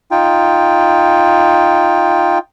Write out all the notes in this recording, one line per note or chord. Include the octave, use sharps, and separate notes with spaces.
D#4 F4 G5